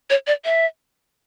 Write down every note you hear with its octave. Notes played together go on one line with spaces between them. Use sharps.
C#5
D5
E5